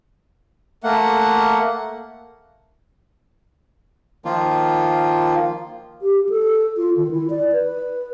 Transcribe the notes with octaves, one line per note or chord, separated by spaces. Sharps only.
A3 A#3 F#5
D#3 F3 A#3 F4
G4
A4
F4
D#3
E4
D5
B4